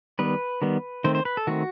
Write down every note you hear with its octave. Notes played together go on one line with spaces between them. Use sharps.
D#3 G3 B3 B4
D#3 G3 B3
D#3 A3 C4 C5
C5
B4
A4
D#3 A3 C4 F#4